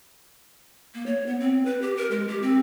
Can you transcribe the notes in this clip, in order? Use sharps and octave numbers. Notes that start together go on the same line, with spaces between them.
A#3
C#5
B3
C4
B4
G4
A#4
G#3
G4
C4